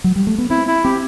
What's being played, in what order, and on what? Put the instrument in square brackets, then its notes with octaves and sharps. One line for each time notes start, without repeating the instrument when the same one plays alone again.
[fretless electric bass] F#3
G3
A3
B3
[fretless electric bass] C4 [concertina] E4
[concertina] E4
[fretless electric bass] C4 [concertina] G4